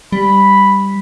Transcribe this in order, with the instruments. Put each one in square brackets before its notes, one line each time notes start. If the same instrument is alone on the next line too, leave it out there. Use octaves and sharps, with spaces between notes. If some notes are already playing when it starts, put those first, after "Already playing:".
[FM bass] G3 [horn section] B5